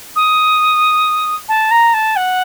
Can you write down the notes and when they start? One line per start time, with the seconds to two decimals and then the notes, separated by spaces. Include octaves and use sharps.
0.15 D#6
1.48 A5
1.71 A#5
1.93 A5
2.16 F#5